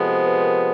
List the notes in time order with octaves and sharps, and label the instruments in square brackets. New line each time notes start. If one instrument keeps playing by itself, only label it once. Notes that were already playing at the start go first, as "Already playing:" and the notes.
Already playing: [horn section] C3 F3 G#3 B3 [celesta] A4 B4
[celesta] C5
B4
A#4